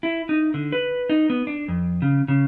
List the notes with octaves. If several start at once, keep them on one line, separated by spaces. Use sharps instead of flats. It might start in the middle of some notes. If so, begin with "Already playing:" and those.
E4
D#4
D3
B4
D#4
B3
D4
F2
C#3
C#3